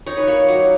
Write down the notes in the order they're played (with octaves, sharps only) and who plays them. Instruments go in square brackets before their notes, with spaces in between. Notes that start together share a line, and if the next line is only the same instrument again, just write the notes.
[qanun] D#4 C#5
B4
A#3 C#5
F#3